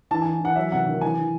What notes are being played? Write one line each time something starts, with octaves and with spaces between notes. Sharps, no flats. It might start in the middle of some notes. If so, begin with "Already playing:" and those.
E3 A5
E3 G#5
E3 F#5
F#3 E5
C3 F#5
D#3
E3 G#5
E3